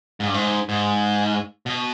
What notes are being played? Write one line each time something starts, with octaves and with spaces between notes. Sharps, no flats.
G#2
G2
G#2
G#2
B2